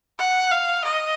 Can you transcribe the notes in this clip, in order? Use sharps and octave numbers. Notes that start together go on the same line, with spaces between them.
F#5
F5
D#5